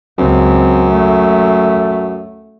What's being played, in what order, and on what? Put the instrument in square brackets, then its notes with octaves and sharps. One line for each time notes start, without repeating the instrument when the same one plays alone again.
[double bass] C#2 C4 [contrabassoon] F#2
[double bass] A3